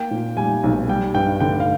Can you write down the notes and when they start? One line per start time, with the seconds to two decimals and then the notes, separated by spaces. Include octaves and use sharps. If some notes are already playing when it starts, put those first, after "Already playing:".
Already playing: A#3 G5
0.11 A#2
0.37 G3 G#5
0.64 B1
0.88 G3 G5
1.15 G2 G5
1.40 D3 G5
1.60 F5